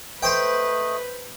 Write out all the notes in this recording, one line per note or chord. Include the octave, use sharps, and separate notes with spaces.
A3 B4 C5 D#5 G5